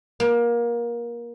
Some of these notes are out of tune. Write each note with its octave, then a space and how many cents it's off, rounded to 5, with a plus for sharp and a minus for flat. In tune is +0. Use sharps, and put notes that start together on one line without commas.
A#3 +25